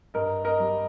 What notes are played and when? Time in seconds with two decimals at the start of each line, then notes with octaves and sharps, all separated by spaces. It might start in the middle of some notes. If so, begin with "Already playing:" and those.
0.14 G2 A#4 D#5
0.44 A#4 D#5
0.60 G3